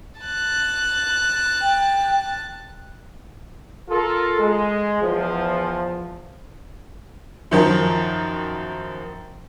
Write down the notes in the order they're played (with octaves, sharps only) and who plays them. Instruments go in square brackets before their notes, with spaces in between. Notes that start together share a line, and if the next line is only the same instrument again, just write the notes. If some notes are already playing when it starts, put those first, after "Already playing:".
[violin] A5 F#6
[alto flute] G5
[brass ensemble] F4 A4 A#4
G#3
E2 F3
[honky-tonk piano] F#2 D#3 F3